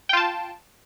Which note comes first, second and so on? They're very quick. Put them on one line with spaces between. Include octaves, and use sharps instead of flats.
G5 F4 A5